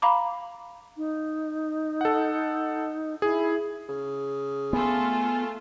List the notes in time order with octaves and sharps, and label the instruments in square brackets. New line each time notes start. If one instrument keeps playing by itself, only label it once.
[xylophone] F5 A#5 B5 D6
[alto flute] D#4
[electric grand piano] A4 F#5
[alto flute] E4 [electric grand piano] G#4
[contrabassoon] C#3
[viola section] A3 F4 A4 [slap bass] B3 [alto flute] G#5